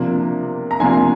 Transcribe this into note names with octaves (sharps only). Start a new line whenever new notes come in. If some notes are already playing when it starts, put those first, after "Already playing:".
Already playing: C3 F3 A#3 D4
A#5
C3 F3 A#3 D4 G#5 C6